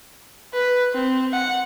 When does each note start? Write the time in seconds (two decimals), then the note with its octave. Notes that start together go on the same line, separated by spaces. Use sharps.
0.53 B4
0.94 C4
1.33 F#5